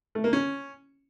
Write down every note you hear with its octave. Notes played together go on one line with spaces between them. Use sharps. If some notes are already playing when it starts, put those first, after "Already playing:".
A3
A#3
C#4